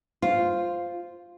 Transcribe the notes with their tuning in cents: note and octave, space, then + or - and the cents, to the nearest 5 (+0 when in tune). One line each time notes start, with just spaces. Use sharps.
F4 +0 C5 +0